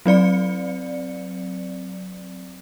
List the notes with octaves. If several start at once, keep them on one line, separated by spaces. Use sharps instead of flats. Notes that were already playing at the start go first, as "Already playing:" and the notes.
F#3 C4 D5 C#7